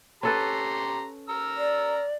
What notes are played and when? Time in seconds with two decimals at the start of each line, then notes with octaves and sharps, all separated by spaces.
0.23 C#4 G4 A4 B4 A#5 C6
1.29 A#5 E6 F6
1.57 D5